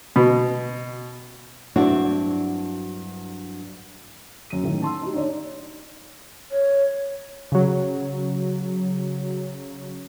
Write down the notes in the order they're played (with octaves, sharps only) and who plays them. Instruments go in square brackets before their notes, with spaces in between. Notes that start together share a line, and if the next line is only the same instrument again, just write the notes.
[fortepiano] B2
[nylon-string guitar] G2 F#3 C4 D4 E4 F#4
[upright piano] F#2 D#7
A2 D#3
A5 C6 E6
D#4 G4
D4 D#4 C#5 D5
[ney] C#5
[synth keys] C#3 F#3